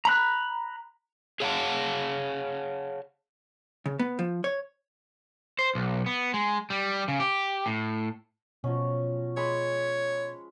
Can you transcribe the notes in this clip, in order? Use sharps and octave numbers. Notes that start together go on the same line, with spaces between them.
A#5 B5 F#6
G#4 C#5 F5 F#5 A5
C#3
B3
F3
C#5
C5
B1
B3
G#3
G3
C#3
G4
A2
B2 F3 F#3 C#4
G#3 C#5 B5